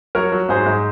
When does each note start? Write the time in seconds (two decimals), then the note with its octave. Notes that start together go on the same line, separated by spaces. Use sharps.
0.15 F#3 A#4 C#5
0.32 F#3
0.49 G#2 G#4 C5
0.66 G#2